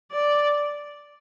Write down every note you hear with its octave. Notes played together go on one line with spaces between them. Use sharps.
D5